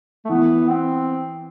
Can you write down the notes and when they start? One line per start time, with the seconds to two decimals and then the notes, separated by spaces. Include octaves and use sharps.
0.25 A3
0.29 E3 B3
0.70 C4